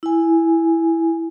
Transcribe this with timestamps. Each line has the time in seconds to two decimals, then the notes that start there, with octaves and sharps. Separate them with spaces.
0.03 E4 G#5